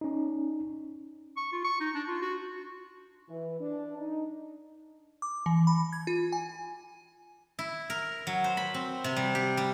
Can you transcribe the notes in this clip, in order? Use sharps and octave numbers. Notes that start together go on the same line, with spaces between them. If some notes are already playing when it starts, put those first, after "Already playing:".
C#4 D#4
C#6
F4
C#6
D#4
D4
F4
F#4
E3
D4
D#4
D6
E3
B5
G#6
F4
G#5
E4
A#4
F#3
C5
B5
C4
C3
G3
G4
G3